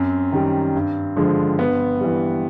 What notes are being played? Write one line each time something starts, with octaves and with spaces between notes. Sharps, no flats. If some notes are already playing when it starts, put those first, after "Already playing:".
Already playing: F#2 C4
D#3 G3
G2
D3 F3 G#3
G2 B3
E3 G3